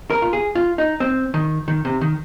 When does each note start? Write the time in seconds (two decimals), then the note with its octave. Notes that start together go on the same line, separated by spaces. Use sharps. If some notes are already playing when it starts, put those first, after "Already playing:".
0.10 A#4
0.22 F4
0.33 G#4
0.55 F4
0.78 D#4
1.00 C4
1.34 D#3
1.68 D#3
1.85 C3
2.01 D#3